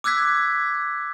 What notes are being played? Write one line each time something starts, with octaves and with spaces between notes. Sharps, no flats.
D6 E6 F#6 G#6 B6